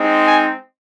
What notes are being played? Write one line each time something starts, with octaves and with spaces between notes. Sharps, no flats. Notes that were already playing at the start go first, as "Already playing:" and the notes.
Already playing: G#3 C4 D#4
G#5